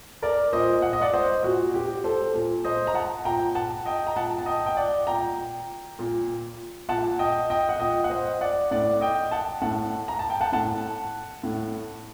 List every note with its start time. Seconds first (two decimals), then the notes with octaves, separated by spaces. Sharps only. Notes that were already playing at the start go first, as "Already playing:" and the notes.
0.22 A#4 D5
0.53 A#2 C5 D#5
0.82 F#5
0.93 D#5
1.02 D5 F#5
1.13 C5 D#5
1.43 A#2 F#4
1.74 G4
2.04 A4 C5
2.34 A#2
2.64 C5 D#5
2.87 A#5
2.95 F#5 A5
3.25 A#2 G5 A#5
3.55 F#5 A5
3.86 D#5 G5
4.07 A#5
4.16 A#2 F#5 A5
4.38 A5
4.46 D#5 G5
4.66 G5
4.77 D5 F#5
5.07 A#2 G5 A#5
5.99 A#2
6.89 A#2 F#5 A5
7.19 D#5 G5
7.50 D#5 G5
7.69 F#5
7.80 A#2 D#5 G5
8.04 F#5
8.10 C5 D#5
8.41 D5 F#5
8.71 A2 D5 F#5
9.01 D#5 G5
9.31 F#5 A5
9.62 A2 F#5 A5
10.08 A#5
10.19 A5
10.30 G5
10.41 F#5 A5
10.52 A2 F#5 A5
11.43 A2